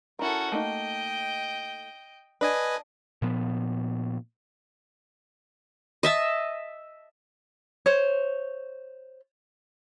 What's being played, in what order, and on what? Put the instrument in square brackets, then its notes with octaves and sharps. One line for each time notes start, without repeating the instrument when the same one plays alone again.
[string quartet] C#4 F#4 A4 [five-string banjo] E4 A#4
[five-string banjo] A3 A#3 D#4 [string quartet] D#5 G5
[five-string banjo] D4 [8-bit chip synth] B4 D#5 G#5
[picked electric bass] A#2 F3 B3
[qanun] D#5 E5 A5
[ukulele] C5 C#5